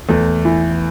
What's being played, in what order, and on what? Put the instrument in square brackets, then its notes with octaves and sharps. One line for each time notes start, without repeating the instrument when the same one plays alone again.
[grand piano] E2 [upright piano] A3
[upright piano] E3